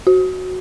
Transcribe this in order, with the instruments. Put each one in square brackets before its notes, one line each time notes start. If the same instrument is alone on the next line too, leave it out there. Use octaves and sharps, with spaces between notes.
[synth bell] F#4